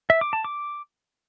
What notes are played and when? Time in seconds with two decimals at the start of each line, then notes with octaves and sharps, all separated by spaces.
0.10 E5
0.21 D6
0.33 A5
0.44 D6